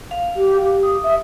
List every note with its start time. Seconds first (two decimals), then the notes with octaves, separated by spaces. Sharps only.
0.11 F5
0.36 G4
0.62 G4
0.83 D#6
1.03 E5